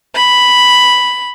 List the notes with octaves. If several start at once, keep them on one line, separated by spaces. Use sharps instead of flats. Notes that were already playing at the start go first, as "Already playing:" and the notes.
B5